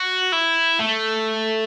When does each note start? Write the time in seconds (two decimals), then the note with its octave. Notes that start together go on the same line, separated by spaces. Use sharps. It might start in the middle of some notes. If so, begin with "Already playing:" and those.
Already playing: F#4
0.33 E4
0.79 A3